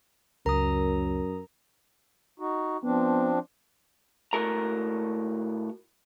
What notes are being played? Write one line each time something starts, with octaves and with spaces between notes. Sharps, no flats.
C#2 F#2 A#4 A#5 D#6
D#4 F#4
F3 B3 C4 D4
A2 F#4 A#4 A#5